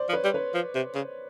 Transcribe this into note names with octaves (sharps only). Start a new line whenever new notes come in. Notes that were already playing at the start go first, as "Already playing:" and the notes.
Already playing: C5 D5
F3
B4 C#5
G3
B4 C#5
F3
C3
C#3